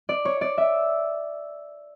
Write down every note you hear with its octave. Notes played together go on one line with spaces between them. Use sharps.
D5
C#5
D5
E5